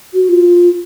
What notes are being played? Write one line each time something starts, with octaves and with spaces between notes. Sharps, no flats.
F#4
F4